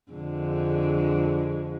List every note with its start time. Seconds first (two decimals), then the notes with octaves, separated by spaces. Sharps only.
0.12 F2 D3 G#3